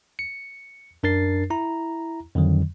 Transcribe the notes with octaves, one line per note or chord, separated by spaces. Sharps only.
C#7
F#2 D4 A#4 A6 C7
E4 A#5
F2 D3 D#3 F#3